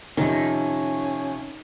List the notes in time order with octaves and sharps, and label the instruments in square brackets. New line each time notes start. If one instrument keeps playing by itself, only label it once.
[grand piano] F2 C3 [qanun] D#3 [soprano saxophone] C#4